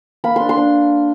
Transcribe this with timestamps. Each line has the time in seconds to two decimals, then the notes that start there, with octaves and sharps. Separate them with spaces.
0.24 A#3 B5
0.36 D4 C6
0.49 C6
0.57 D4